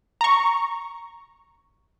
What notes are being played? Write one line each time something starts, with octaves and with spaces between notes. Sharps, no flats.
A#5 C#6